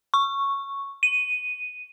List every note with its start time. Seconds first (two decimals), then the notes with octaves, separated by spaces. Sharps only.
0.14 C#6
1.03 D#7